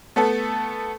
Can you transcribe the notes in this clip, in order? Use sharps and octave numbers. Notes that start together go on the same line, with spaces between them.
A3 B3 A4